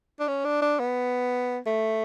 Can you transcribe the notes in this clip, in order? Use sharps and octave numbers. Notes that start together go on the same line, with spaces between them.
D4
C#4
D4
D4
B3
A3